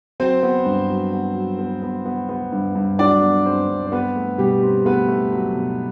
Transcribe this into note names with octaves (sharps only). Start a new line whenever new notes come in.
F#3 C4 C5
B3
G2
F#3
B3
F#3
B3
B3
B3
B3
G2
G2
F#3 D4 D5
B3
G2 C4 C5
G2
C5
B3 C4 B4
A3
B2 G3 G4
C4
A3 B3 B4
A3
F#3
B2